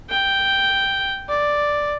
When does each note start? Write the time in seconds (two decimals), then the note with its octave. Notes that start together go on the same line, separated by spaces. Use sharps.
0.10 G5
1.29 D5